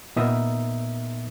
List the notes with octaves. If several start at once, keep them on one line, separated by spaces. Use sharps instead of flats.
A#2 B3 D#4 A#4 E5 D#6